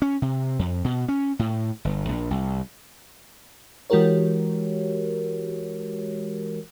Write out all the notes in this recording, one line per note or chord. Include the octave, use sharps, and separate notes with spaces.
C#4
C3
F2
B2
C#4
A2
G1
A#1
C2
E3 G#3 F#4 G4 A#4 C#5